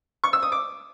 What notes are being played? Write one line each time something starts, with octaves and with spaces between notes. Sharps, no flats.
C#6
E6
D#6
D6